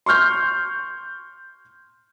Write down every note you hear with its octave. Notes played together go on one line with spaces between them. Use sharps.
C6 C#6 F6 G6